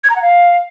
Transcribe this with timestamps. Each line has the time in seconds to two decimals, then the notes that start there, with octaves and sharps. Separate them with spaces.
0.04 G#6
0.10 A#5
0.16 F#5
0.22 F5